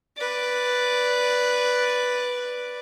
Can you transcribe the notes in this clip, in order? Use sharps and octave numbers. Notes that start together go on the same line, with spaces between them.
B4 D5